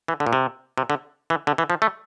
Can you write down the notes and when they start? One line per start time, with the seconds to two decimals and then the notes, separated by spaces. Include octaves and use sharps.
0.08 E3
0.20 D3
0.26 A#2
0.33 C3
0.78 C3
0.90 D3
1.30 E3
1.47 D3
1.58 E3
1.70 F3
1.82 A3